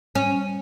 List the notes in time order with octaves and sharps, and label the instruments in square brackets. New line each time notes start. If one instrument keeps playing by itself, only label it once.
[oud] C#4